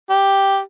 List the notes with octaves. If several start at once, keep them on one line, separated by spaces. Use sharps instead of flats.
G4